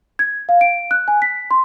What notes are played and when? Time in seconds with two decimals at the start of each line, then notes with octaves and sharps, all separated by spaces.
0.19 G#6
0.49 F5
0.61 D7
0.91 F#6
1.08 G#5
1.22 B6
1.51 C6